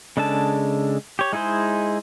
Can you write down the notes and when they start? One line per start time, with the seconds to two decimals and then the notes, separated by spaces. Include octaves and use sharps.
0.17 C#3 G#3 D4 A4 A5
1.19 G4 C#5
1.33 G#3 D#4 E4 G#4 C5